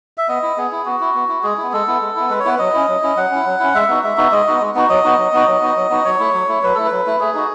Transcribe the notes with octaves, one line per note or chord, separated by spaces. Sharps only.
E5
B3 D#5
E4
B3 G#4
E4
B3 F#4
E4
B3
E4
G#3 G#4
B3 E4
G#3 A4
B3 E4
G#3
B3 E4
G#3 B4
C#5
B3 E4 B4
F#3 D#5
C#4 E4
F#3
C#4 E4
F#3 F#5
C#4 E4
F#3
C#4 E4
G#3 E5
B3 D#4 F#4
G#3 E5
B3 D#4 F#4
G#3 D#5
B3 D#4 F#4
G#3
B3 D#4 F#4
F#3 D#5
B3 D#4 F#4
F#3
B3 D#4 F#4
F#3
B3 D#4 F#4
F#3
B3 D#4 F#4
F#3 C#5
A3 E4
F#3
A3 E4
F#3 B4
A3 E4 A4
B4
F#3
A3 E4
A3 G#4
D#4 F#4